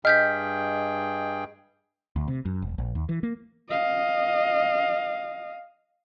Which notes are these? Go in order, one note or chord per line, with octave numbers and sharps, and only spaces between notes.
G2 G#4 D#5 G5 F6 G6 B6
D2
C3
F#2
E1
A#1
D#2
E3
A#3
D#5 F5